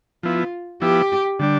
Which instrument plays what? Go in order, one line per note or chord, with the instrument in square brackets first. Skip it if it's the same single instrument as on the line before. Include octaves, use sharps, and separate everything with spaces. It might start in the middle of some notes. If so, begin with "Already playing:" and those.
[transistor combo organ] F3 B3 E4 [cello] F4
[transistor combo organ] F3 B3 E4 [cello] G4
[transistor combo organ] D3 G3 D4